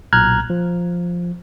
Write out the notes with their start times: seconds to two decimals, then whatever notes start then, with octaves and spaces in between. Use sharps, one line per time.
0.13 B1 A#2 A#5 F6 F#6 G#6
0.50 F3